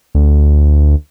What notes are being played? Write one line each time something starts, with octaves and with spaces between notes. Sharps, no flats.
D2